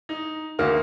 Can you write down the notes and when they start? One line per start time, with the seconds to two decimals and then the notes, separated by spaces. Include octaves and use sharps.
0.09 D#4
0.59 D2 D#3 A#3 D#4 F#4 F6